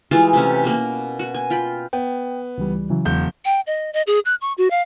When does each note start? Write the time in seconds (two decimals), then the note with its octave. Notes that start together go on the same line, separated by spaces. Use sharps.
0.11 E3 G3 G#3 F4
0.33 C3 A3 C#4
0.64 B2 A#3
1.19 F#4
1.34 G#5
1.50 F4 G5 B5
1.93 B3 G5
2.58 C#2 E3 G3
2.90 C#3 E3 F#3
3.05 E1 G6
3.45 G5
3.67 D#5
3.93 D#5
4.07 G#4
4.25 F#6
4.41 C#6
4.58 F#4
4.71 F5